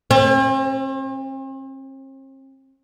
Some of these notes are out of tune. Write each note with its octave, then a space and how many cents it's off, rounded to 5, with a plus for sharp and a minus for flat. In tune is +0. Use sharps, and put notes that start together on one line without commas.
C4 +45